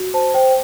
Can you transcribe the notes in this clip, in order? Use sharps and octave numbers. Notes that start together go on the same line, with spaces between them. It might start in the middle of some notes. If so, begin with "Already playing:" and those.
Already playing: F#4
C5 A5
C5 G5